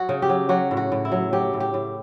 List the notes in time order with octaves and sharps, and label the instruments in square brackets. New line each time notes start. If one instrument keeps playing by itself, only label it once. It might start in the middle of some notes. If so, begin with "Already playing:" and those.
Already playing: [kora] F#3 F#4
C#3
G4
F#3
F#3 F#4
A2
F#4
A2
E4
F#3
F#3 G4
A2
G4
A2